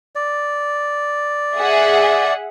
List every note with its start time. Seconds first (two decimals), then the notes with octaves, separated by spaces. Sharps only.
0.15 D5
1.56 G#4 E5 F#5